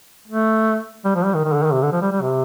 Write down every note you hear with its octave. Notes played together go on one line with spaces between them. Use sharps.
A3
G3
F3
G3
D#3
D#3
D3
D#3
C3
D3
F3
G3
G3
C3